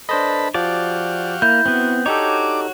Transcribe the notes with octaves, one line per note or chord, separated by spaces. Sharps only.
D4 A4 B4 C5 D#5 B5
F3 F#4 G4 D5 F5
A#3 E4 G6
B3 C4 F#4
D4 D#4 F#4 G4 A4 C#5 D6